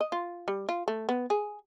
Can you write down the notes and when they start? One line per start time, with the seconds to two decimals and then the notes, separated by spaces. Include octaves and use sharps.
0.01 D#5
0.12 F4
0.48 G3
0.69 F4
0.88 A3
1.09 B3
1.30 G#4